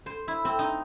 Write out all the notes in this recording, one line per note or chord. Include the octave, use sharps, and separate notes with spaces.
C5
E4
C4
D#4